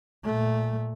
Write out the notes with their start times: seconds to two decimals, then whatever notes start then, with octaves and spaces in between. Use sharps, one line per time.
0.24 A#2 A3